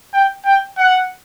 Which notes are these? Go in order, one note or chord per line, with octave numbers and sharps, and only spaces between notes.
G5
G5
F#5